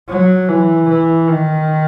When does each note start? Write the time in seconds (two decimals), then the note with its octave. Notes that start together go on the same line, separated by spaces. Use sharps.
0.09 F#3
0.49 E3
0.89 E3
1.30 D#3